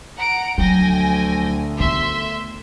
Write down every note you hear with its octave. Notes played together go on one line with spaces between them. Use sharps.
F#5 A#5 D7
D2 F3 F#3 G5 G#5 A#6
D#3 B3 E5 C6